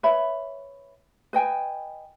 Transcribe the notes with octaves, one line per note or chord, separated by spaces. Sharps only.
B4 C#5 E5 B5
B4 D#5 G5 G#5